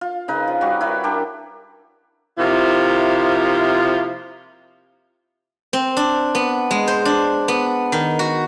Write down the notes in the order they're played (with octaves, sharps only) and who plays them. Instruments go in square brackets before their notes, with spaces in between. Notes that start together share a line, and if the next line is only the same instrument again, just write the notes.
[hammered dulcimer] F4
C#3 D#4 B4
F3
G3 F#4
E4 B4 C#5
D4 G4 A#4
[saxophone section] C3 F3 A#3 E4 F4
[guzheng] C4
D4
B3
G#3
C5
D4
B3
D#3
F#4